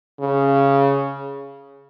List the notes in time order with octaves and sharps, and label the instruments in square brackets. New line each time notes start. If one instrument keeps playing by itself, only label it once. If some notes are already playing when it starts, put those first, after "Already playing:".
[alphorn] C#3